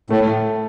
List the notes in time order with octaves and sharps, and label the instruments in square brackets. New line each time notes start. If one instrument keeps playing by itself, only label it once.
[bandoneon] A2 [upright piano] A3